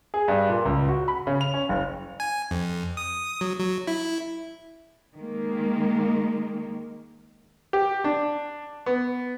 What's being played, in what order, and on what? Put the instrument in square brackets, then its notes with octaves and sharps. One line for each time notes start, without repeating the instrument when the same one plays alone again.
[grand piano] G#4
G2
A#2
C#2
F#4
B5
C#3
F7
C#4
F#1
[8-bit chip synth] G#5
F2
D#6
F#3
F#3
E4
[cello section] D#3 G#3 A#3
[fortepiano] G4
D4
B3